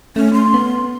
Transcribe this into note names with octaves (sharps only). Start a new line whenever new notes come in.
A3 C#4
C6
B3